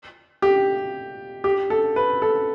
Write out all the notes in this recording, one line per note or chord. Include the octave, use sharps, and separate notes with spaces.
G4
G4
A4
B4
A4